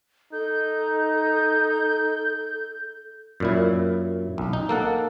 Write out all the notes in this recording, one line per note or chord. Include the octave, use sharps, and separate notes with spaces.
D#4 A4 G6
F#2 A#2 E4
B1
D#4
A#3 A4 F#5